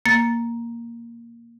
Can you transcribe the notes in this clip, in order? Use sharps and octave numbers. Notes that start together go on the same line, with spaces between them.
A#3 A6